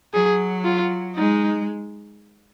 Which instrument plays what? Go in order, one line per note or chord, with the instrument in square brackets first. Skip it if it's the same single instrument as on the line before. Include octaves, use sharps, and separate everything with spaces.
[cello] F#3 [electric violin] G#4
[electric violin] F4
[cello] G#3 [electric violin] D#4